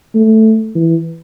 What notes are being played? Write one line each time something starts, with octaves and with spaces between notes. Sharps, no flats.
A3
E3